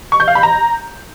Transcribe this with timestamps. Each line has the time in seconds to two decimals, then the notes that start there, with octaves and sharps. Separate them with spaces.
0.12 C#6
0.20 G6
0.28 F5
0.35 B5
0.43 A#5